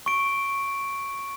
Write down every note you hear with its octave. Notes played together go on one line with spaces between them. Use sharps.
C#6 D7